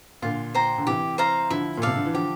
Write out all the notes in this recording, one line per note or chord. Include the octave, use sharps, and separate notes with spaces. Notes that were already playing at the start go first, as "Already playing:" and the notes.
A#2 D3 F4
C5 G5 A#5
D3
C3 E3 G4
C5 F5 A#5
D3 F3 E4
A#2
C3 A4 D5 F5
D3
E3
D3 F3 G4